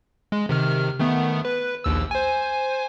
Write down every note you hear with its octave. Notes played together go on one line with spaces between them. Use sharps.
G#3
C3 D#3 F6
D#3 A3 B3
B4
A#1 D#2 E6
C5 G#5